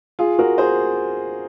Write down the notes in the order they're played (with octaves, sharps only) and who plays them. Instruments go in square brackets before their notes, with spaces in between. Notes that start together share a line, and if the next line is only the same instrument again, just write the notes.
[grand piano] F4 G#4
F#4 A#4
G#4 C5